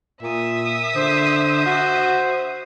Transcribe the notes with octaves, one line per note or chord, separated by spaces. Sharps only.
A#2 E5 D#6
D3 C5
F#4